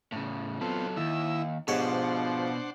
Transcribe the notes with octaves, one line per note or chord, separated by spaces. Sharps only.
A2 C#3
F#3 B3 C4 F4 A4
D#2 D#3 E4 E5
G#2 B2 F3 D4 G4 C5 C#5 F#5